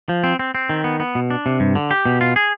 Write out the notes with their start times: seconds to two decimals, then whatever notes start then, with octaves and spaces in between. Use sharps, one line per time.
0.09 F3
0.24 C4
0.39 C4
0.55 C4
0.69 D#3
0.84 B3
1.00 B3
1.15 B2
1.30 D4
1.46 C3
1.60 G2
1.75 D3
1.91 G4
2.06 B2
2.21 F4
2.36 G#4